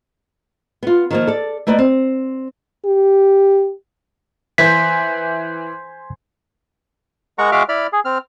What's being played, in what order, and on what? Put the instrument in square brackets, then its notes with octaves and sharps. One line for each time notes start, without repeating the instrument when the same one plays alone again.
[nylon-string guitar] B3 F4
D#3 F3 A#3
A4 D5
A3 A#3 B4 D5 D#5
C4
[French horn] G4
[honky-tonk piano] E3 [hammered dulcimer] C5 G#5 [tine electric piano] B6
[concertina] G#3 A#4 F#5 A#5 C#6
G#3 F#4 E5 F5 D6 F6
E4 D5 B5 F6
G#4
C4 F6